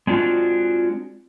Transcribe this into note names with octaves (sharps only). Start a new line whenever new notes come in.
G#3 C4 D4 F4 F#4